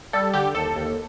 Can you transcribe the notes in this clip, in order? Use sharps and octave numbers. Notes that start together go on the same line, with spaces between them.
G3 A4
D3 G4
D#2 A4
D#2